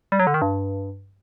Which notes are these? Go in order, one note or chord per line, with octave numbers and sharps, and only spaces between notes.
G3
F#3
D3
D#3
G2